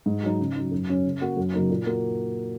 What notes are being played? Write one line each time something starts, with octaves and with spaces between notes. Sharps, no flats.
G#2
F#3 D#4
C#3
F#3 D#4
F#2
F#3 C#4
C#3
A#3 F#4
F#2
C#3 F#3 A#3 D#4
A#2
A#3 F#4